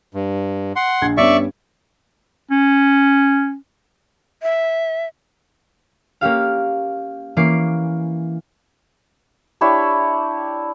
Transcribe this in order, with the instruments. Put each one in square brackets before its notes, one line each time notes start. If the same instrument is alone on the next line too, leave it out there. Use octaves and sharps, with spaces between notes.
[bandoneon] G2
F#5 C6
[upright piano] A#1 G#6
[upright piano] G2 B3 C#4 [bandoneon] D5 E5 C#6
[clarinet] C#4
[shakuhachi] E5
[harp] A#3 C#4 G4 F5
E3 A#3 C#4 D6 C7
[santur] D4 E4 G4 C#5